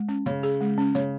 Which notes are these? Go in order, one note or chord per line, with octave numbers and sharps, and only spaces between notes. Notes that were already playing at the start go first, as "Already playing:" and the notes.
Already playing: G#3
C#4
C#3 C#5
G#4
G#3
C#4
C#3 C#5